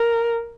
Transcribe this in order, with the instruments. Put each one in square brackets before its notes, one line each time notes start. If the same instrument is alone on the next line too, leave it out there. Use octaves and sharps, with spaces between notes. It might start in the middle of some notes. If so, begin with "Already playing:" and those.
Already playing: [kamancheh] A#4